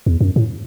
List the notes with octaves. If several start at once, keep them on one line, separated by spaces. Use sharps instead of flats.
E2
F#2
A2